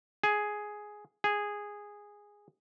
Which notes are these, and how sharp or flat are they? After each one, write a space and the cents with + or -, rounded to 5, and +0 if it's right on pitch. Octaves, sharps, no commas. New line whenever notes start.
G#4 +5
G#4 -10